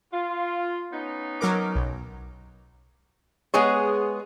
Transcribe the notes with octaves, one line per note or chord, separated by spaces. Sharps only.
F4
B3 C#4 D#4
F#3 A#4 D6
B1
G#3 B3 G#4 C#5